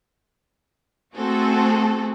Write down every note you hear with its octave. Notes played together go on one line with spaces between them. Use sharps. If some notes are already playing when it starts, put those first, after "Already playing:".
A3 C4 F#4 G#4 A4